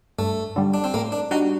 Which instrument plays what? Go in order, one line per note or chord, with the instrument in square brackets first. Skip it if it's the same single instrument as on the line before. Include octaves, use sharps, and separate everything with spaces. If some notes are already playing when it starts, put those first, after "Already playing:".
[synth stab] G2 [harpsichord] A3
[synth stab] D3 G3
[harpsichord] D4
C4
[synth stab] A2 [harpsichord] A#3
[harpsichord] D4
[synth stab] G3 D4 F#4 [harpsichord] D#4